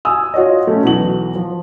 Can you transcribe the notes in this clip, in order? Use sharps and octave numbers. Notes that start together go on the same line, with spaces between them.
G#5 D#6 E6
F4 F#4 C#5 D#5
A3 C#4
B1 E3 F#4 F#7
F3